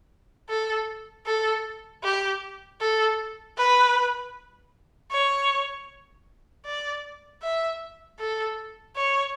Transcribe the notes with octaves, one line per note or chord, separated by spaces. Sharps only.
A4
A4
G4
A4
B4
C#5
D5
E5
A4
C#5